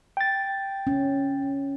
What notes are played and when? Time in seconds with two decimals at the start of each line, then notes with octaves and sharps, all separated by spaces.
0.17 G5 A6
0.87 C#4